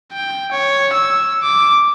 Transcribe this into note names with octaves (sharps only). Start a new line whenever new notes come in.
G5
C#5
E6
D6